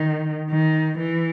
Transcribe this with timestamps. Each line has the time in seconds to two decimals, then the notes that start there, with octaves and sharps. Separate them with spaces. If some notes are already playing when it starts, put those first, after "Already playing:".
Already playing: D#3
0.50 D#3
0.98 E3